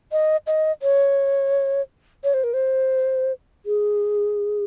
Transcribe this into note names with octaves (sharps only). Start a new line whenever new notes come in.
D#5
D#5
C#5
C#5
C5
A#4
C5
G#4